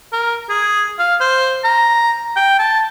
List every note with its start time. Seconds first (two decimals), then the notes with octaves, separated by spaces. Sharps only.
0.12 A#4
0.49 G#4
0.99 F5
1.20 C5
1.64 A#5
2.36 G5
2.59 A5